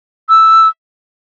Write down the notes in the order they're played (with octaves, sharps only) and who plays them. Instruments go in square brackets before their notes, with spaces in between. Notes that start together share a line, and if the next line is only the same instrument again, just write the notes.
[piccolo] E6